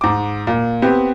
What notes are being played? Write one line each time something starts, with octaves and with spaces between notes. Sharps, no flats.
G#2 D6
A#2
B3 C4 G4